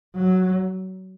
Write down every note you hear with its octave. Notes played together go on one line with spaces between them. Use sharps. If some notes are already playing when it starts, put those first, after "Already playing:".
F#3